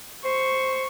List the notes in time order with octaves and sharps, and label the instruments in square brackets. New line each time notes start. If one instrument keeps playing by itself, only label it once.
[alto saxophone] C5 [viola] C#6